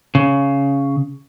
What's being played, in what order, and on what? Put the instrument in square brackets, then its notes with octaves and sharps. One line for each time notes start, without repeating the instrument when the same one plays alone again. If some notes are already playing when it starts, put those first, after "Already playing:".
[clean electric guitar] C#3